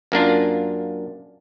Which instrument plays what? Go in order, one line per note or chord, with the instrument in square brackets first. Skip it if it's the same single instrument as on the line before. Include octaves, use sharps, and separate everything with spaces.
[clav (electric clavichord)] F#2 A#3 D4 F4